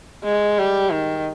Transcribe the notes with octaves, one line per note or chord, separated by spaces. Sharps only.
G#3
G3
D#3